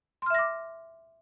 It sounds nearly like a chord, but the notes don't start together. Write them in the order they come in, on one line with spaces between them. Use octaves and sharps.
C6 F6 E5 A#6 D6